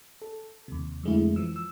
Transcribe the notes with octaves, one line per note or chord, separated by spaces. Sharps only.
A4
D#2 C3
F2 D3 G#3 A3 E4
E3 F3 E6
E6